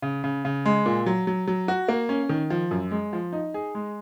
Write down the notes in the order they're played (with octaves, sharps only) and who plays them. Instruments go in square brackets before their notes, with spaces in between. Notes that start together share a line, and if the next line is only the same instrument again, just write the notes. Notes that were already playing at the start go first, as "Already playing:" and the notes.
[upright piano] C#3
C#3
C#3
G#3
A#2
F#3
F#3
F#3
F#4
A#3
C#4
D#3
F3
F#2
G#3
F3
D#4
G#4
G#3